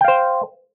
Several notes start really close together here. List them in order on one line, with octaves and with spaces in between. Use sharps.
G5 F5 C5